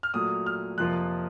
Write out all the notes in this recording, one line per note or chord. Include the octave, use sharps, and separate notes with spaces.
F6
A#2 F#3 A3 D#6
F6
F2 C3 F3 A#3 F4 F#6